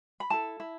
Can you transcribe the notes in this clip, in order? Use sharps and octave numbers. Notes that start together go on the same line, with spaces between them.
B5
E4 A4 A5
E4